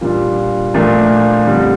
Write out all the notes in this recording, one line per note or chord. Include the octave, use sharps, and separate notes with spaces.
A#2 G3 D4 F4
A#2 F3 A3 D4 F4
F2 D3 G3